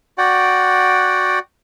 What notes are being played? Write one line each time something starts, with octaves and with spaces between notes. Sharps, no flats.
F#4 D5 F#5 G5